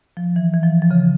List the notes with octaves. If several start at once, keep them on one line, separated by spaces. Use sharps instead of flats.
F3
E3
E3
F3
F3
C#3